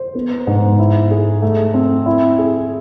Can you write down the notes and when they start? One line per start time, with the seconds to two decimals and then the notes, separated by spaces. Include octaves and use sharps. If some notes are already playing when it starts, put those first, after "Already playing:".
Already playing: C5
0.15 B3
0.47 G#2
0.79 E4
1.11 G#4
1.42 A3
1.74 C4
2.06 E4
2.39 G#4